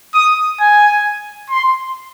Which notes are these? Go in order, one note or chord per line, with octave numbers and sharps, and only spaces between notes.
D#6
G#5
C6